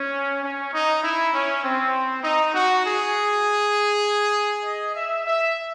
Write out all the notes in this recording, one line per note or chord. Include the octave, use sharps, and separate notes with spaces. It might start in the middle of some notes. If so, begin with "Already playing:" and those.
Already playing: C#4
C#4
D#4
E4
C#4
C4
D#4
F#4
G#4
D#5
E5
E5